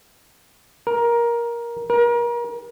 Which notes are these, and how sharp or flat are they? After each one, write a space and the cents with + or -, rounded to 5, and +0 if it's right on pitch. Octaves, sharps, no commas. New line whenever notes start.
A#4 +15
A#4 +35